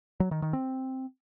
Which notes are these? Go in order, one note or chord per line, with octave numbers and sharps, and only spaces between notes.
F#3
D#3
D#3
C4